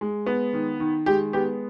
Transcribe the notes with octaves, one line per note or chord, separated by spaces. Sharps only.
G#3
B3
D#3
D#3
G#3 G4
B3 G4